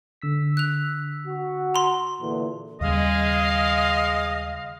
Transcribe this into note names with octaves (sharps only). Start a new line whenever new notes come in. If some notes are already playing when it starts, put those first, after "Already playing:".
D3 E6 B6
F#6 F7
F#4
A#5 C6
E2 A#2 D3
D#2 C#3 G3 G#3 D#5 F5